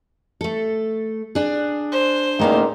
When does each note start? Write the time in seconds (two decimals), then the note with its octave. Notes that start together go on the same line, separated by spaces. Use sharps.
0.41 A3 A4
1.35 D4 G#4
1.92 C5
2.39 E2 A#2 D#3 A3 A#3 C#4